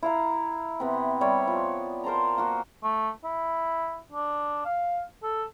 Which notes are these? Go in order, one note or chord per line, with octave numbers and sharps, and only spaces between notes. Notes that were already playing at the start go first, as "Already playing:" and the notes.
E4 F5 A#5
C3 B3
G3 C#5 D5
F3
A#4 C5 A5 A#5
A#3 F#4
A3
E4
D4
F5
A4